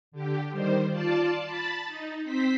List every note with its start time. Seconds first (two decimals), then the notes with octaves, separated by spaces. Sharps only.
0.12 D3 G4
0.51 D#3 G3 C5
0.88 F4 D5 A5
1.44 A5 B5 A6
1.85 D#4
2.24 C4 C5 B6